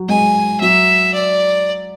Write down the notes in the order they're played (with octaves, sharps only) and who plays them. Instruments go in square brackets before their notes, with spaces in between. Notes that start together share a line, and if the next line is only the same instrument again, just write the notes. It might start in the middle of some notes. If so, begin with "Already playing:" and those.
Already playing: [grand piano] F#3
[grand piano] G#3 [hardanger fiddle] G#5
[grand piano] F#3 [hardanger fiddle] E5
[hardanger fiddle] D5